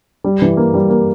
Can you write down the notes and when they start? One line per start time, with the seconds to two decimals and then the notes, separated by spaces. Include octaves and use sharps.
0.24 G3
0.42 E3
0.57 A#3
0.74 G3
0.90 A#3